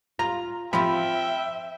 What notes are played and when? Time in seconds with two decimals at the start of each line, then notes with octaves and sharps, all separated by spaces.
0.19 F4 A#5
0.73 F3 C4 F4 E5 G5 B5